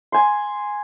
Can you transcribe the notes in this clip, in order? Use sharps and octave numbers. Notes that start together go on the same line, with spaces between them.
G#5 C6